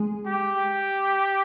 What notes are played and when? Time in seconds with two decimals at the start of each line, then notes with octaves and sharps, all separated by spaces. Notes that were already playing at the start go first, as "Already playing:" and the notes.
Already playing: G#3 G#4
0.27 G4